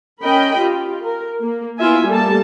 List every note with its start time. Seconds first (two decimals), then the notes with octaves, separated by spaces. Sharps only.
0.21 C#4 A#4 D#5 G5 B5
0.56 F4 G4
1.02 A#4
1.40 A#3
1.78 B3 E4 F4 E5 G#5
2.07 G3 A3 A#3 A5